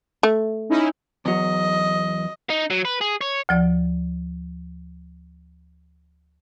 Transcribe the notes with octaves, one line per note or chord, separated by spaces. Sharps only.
A3
C#4 D#4 E4
E2 F#3 D#5
D#4
F#3
B4
G#4
C#5
D2 F3 D5